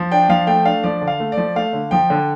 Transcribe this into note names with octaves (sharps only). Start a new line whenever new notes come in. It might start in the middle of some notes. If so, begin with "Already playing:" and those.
Already playing: F3
D4 G5
F3 F5
A3 G5
D4 F5
F3 D5
D3
F5
A3
D5
F3
A3 F5
D3
F3 G5
D3